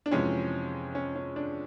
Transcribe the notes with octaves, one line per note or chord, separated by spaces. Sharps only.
D4
F2 C3 E3 G#3 C#4
C#4
C#4
D4